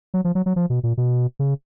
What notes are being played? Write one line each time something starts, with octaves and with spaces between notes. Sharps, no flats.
F#3
F3
F#3
F#3
F3
B2
A#2
B2
C#3